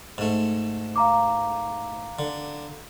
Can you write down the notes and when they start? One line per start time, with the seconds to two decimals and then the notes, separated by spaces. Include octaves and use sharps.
0.18 G#2 A3
0.96 F5 A#5 D6
2.19 D3